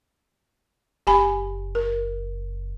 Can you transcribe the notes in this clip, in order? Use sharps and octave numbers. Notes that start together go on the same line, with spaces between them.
F#1 G4 G#5 B5
A#4